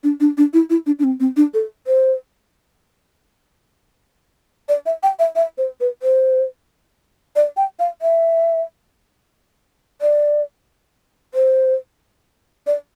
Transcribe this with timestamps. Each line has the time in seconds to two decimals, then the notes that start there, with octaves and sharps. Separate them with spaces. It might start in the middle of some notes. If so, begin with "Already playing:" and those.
0.04 D4
0.20 D4
0.38 D4
0.53 E4
0.70 E4
0.86 D4
0.99 D4
1.04 C4
1.20 C4
1.37 D4
1.54 A4
1.87 C5
4.69 D5
4.86 E5
5.03 G5
5.19 E5
5.36 E5
5.58 C5
5.80 B4
6.03 C5
7.36 D5
7.57 G5
7.79 F5
8.02 E5
10.01 D5
11.34 C5
12.67 D5